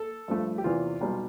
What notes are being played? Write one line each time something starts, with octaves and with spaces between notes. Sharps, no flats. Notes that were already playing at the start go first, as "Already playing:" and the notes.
Already playing: A4
G2 F3 A3
G4
E2 C3 E3 F4
B1 B2 G3